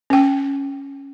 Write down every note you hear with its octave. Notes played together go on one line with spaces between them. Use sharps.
C#4 G5